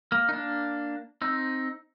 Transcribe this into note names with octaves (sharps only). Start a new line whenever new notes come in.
A#3
D#4
A#3 D4
C4 D#4